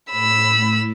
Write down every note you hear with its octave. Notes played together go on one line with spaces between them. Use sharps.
A2 B5 E6